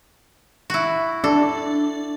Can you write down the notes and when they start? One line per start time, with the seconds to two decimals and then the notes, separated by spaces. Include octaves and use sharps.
0.70 E4 F#4
1.24 D4 A4